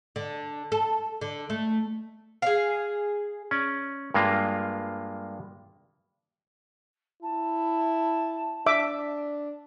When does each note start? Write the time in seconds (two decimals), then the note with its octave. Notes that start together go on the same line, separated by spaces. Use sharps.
0.16 D3
0.72 A4
1.21 D3
1.50 A3
2.42 G#4 F5
3.51 C#4 D5
4.14 G2 G#3 A#3 F4
7.22 E4 A5
8.66 D4 E5 D6